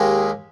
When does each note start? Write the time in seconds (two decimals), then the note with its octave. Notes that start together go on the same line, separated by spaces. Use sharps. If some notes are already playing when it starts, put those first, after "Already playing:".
Already playing: D#2 D#3 G#3 D#4 G4